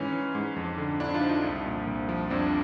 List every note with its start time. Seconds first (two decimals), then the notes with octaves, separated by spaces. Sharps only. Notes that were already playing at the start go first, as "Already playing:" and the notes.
Already playing: G#2 E3 C#4
0.13 E3
0.35 G#2
0.56 F2
0.78 D3
1.00 F2 D4 E4
1.14 D#4 F4
1.21 F3
1.29 D#4 F4
1.44 C2
1.66 A#2
1.87 C2
2.09 F3
2.30 F2 C4 D4